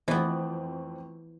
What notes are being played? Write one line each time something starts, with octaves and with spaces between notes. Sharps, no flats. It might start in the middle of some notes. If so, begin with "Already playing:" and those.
F2 E3 A3 B3 C4